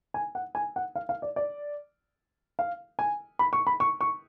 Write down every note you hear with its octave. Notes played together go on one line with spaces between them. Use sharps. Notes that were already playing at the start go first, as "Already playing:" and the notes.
G#5
F#5
G#5
F#5
F5
F5
D5
D5
F5
G#5
B5
C#6
B5
C#6
C#6